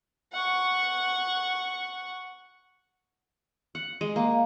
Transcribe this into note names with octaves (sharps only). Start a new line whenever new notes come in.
F#5 C#6
F#5
G#3
A#3